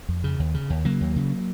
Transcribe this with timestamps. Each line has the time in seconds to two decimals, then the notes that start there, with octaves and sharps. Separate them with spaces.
0.09 F2
0.24 C#3
0.40 D#2
0.54 C#3
0.70 D#2
0.85 C#3 F#3 A#3
1.01 D#2
1.16 C#3